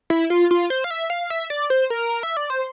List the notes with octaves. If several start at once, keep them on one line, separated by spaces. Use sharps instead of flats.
E4
F4
F4
C5
F5
E5
F5
E5
D5
C5
A#4
E5
D5
C5